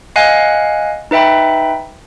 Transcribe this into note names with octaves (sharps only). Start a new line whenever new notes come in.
D#5 F5 F#5 G#5 F#6
D#4 B4 E5 G5 B5